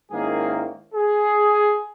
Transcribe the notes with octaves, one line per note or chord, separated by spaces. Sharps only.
G#2 D#3 A#3 C#4 E4 G#4
G#4